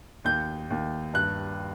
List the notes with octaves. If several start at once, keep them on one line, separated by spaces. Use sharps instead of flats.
D#2 G6
D#2
G2 F#6